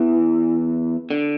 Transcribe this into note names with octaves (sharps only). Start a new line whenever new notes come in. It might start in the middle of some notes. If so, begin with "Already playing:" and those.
Already playing: E2 E3
D3